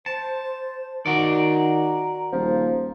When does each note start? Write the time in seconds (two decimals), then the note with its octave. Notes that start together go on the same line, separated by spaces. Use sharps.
0.06 C5 A5
1.06 D#3 F#4 D5 A#5
2.32 D#1 F3